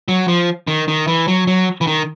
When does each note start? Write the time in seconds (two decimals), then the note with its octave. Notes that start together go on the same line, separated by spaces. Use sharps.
0.08 F#3
0.28 F3
0.68 D#3
0.88 D#3
1.07 E3
1.28 F#3
1.47 F#3
1.81 E3
1.87 D#3